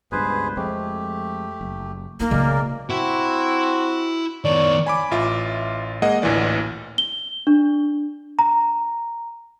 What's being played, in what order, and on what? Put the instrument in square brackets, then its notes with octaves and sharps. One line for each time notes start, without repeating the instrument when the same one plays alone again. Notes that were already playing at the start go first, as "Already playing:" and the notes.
[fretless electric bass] C#2 G2 B2 [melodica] G#4 B4 C5
[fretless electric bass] F2 G#3 C4 [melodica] A3 G4
[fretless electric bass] F#1
[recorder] A#3 [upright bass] D#4
[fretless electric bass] B1 F#3 G#3 [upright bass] C#3 A3 [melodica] A#4 D5
[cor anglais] C4 [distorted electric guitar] E4 [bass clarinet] F#4
[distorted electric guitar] D#3 B3 [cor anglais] C#5 [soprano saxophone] D5
[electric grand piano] G#5 B5 D6
A1 F4 E5
G#3 A#3 G#4 D#5 F#5
A1 D2 A#2 E3 D5
[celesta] G7
D4
A#5